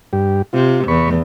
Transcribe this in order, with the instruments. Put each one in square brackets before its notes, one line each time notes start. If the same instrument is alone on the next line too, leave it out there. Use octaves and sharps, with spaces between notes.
[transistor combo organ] G2 G4
[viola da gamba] C3 [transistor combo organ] F4
[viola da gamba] E2 [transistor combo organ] B5 C#6